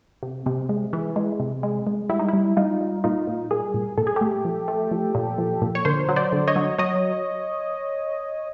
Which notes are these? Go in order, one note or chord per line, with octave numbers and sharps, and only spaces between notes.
C3
C3
G#3
E3
G#3
C3
G#3
G#3
G3 E4
D#4
G3 E4
G3 D#4 F4
G3
A#2 D#4 F4
A#2
G3 G#4 A#4
A#2
A#2 A4
G#4
A3 G4 A4
F3
A3
F3
A#2
F3
A#2
C#5
D3 A#4 C5
F#3
C5 D5
D3
C#5 D#5
F#3
F#3 C#5 D#5